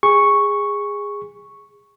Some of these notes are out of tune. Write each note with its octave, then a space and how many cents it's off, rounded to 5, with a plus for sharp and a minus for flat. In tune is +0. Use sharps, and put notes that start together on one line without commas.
G#4 -20 C#6 +0